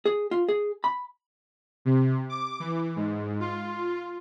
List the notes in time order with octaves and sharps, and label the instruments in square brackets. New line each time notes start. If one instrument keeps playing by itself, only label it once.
[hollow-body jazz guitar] G#4
F4
G#4
B5
[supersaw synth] C3
D6
E3
G#2
F4